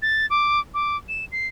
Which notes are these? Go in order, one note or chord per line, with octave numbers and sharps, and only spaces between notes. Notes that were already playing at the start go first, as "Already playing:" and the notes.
A6
D6
D6
E7
C7